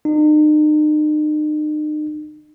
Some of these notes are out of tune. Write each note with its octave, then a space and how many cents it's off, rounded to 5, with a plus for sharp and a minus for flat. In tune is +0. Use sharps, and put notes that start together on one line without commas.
D#4 -40